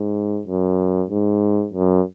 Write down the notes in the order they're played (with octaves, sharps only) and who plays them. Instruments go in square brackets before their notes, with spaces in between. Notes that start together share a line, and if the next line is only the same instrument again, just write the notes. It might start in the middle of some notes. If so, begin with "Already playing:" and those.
Already playing: [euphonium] G#2
F#2
G#2
F#2